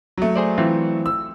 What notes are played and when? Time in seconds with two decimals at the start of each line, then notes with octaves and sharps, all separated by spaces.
0.18 F#3 A3
0.36 G#4 C5 D5
0.58 E3 C4 F4
1.06 E6